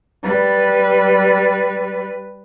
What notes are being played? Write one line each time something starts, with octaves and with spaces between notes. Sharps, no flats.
G3 B4